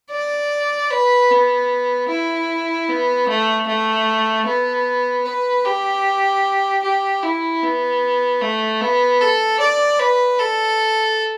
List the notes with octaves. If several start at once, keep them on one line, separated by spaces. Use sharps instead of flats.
D5
B4
B3
E4
B3
A3
A3
B3
B4
G4
G4
E4
B3
A3
B3
A4
D5
B4
A4